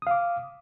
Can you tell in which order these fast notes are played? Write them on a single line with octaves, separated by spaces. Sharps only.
D#6 F5 D6